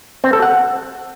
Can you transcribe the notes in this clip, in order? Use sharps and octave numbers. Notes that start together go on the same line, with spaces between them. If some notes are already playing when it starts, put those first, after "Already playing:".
C4
A4
F#5